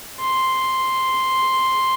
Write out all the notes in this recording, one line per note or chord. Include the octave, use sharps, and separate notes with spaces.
C6